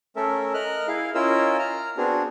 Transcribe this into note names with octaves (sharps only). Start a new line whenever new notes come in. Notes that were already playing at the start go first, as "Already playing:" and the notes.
A3 C#4 A4 A#4 E5
A#4 D#5 F6 F#6
E4 G#4 F5
C#4 E4 F4 A#4 D#5 E6
A#5 F6
B3 C4 D4 F#4 G#4